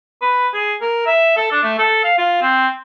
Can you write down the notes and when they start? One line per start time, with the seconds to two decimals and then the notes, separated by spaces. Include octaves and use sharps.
0.22 B4
0.54 G#4
0.81 A#4
1.06 E5
1.37 A4
1.52 D4
1.63 A3
1.79 A4
2.04 F5
2.18 F4
2.42 C4